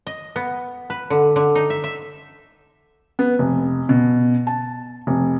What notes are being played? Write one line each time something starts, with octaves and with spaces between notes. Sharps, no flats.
D#5
B3
B4
D3
D3
D#4
E5
E5
B3
F1
B2
A5
F1